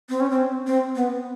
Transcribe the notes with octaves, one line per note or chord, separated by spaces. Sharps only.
C4
C#4
C4
C4
B3